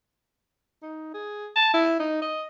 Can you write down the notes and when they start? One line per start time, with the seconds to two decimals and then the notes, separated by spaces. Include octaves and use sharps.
0.83 D#4
1.14 G#4
1.56 A5
1.74 E4
2.00 D#4
2.22 D#5